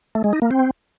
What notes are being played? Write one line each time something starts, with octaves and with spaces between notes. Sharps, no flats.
A3
G#3
D#4
A#3
C4